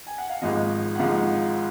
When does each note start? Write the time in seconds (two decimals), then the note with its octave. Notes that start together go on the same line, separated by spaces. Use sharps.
0.07 G#5
0.18 F#5
0.30 F5
0.42 G#1 G#2 F3 D#5
0.95 F#5
0.99 G#1 G#2 F3 F5